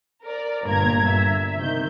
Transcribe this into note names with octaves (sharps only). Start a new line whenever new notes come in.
A#4 D5
G1 G2 A#2 A#5 G#6
E5
C3 D#3 G6